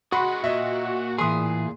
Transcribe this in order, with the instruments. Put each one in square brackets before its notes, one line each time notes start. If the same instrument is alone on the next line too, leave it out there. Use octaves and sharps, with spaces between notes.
[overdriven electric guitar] G#3 B4 [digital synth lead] F#4 [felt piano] F#5 B5 C6
[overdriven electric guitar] A#2 [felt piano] D#5 E5
[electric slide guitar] A2 E3 G#4 [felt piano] C6 D#6